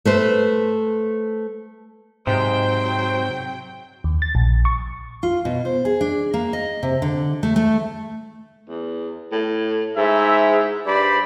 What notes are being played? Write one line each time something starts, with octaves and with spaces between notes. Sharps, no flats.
A3 B4 C5
G#2 C3 F#3 C5 G5
D#2
A6
A#1
C#6
F4
B2
C5
G#4
D4
A#3
D#5
C3
D3
A3
A3
E2
A2
G#2 E4 E5
G2 C5 D5 B5